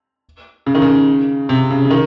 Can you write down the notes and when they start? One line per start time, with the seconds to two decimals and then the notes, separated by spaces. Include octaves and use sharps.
0.66 C#3
0.75 D#3
0.82 C#3
1.49 C3
1.70 C#3
1.85 C#3
1.90 D#3